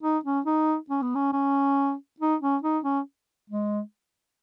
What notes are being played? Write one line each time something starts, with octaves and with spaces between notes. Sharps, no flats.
D#4
C#4
D#4
C#4
B3
C#4
C#4
D#4
C#4
D#4
C#4
G#3